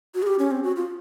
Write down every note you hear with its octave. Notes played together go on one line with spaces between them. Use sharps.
F#4
G#4
G4
C#4
C4
F#4
F4